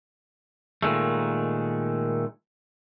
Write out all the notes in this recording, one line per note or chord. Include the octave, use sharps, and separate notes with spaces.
A#2 D#3 G#3 A3